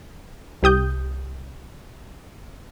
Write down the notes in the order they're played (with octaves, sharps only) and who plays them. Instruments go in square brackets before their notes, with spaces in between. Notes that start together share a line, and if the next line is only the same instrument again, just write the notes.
[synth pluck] C2 G4 D#6 G6